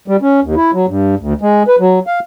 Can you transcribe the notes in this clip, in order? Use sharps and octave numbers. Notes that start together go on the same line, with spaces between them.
G3
C#4
D#2
E4
F#3
G2
D2
G#3
B4
F#3
F5